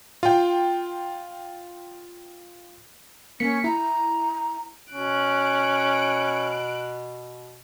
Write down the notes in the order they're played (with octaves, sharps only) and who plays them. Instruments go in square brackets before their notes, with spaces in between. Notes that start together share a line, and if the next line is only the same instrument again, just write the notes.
[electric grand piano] F4 G5
[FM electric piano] A#3 B6 C#7 [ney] C#4
[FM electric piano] E4 [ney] A#5
[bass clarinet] B2 [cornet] C#4 [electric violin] F#6 D7